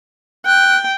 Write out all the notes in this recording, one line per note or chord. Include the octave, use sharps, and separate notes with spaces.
G5 F#6